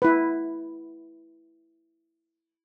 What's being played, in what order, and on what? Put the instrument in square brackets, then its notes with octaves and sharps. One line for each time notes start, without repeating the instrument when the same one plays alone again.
[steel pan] E4 B4